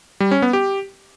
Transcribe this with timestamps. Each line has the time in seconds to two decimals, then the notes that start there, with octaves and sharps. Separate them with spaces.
0.20 G3
0.31 C#4
0.42 B3
0.53 G4